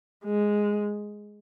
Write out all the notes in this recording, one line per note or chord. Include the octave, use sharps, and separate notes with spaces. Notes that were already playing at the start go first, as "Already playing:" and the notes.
G#3